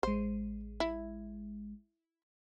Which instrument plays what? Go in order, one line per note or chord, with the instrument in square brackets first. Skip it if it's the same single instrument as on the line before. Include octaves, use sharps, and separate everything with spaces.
[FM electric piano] A1 G#3 [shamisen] C5
[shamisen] E4